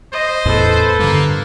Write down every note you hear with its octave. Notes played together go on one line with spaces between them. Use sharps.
C5 D#5
E2 A2 A4 B4
G2 D3 A#3